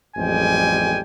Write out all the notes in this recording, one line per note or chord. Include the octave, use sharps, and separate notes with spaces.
A1 F2 G3 G#3 G5 G#5